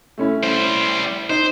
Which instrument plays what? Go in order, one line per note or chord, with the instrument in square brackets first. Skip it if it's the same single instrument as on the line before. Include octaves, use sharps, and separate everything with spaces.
[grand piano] A3 C#4 E4
[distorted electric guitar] G3 C5
[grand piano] D#4 [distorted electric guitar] C5